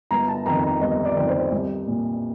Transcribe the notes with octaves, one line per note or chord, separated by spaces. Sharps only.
G1 A#5
A5
F2 D#3 A#5
A#5
G1 D#5
D5
F2 D#3
C5
C2
A#2